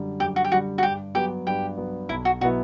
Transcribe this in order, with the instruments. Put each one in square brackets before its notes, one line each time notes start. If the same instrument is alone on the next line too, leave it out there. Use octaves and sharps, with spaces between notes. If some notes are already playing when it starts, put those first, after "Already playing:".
Already playing: [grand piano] F#2 D3 G3
[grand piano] F#2 [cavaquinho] G4
[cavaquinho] F#4
G4
[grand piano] D3 G3 [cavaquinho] F#4
[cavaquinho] F#4
[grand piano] G2 [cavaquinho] G4
[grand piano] F#3 B3 [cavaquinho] G4
[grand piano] G2 [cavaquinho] G4
[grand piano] F#3 B3
[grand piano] B1 [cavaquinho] E4
[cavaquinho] F#4
[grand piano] B2 F#3 B3 E4 [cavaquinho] F#4